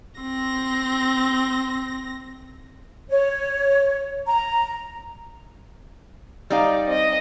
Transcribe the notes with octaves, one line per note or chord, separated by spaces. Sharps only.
C4 A#6
C#5
A#5
G3 D#4 D5 F5
C4 D#5